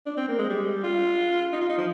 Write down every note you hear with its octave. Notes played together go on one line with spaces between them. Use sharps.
D4
C4
A#3
G#3
G3
F4
D#4
F4
D#4
F3